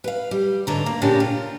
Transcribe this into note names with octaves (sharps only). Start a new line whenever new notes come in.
B4 F5
G3
G#2 D3 B4 C#5 A#5
A#3
A#2 C#3 C#4 D4 G4 A#4
F4